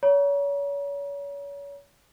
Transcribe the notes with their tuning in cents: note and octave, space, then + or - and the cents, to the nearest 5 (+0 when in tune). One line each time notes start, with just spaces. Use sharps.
C#5 +35 A#5 +40